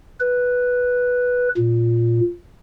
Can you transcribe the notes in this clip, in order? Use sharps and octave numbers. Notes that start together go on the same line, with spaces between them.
B4
A#2